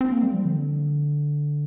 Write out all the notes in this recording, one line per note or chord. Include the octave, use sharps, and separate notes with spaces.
C4
A#3
G3
F3
D3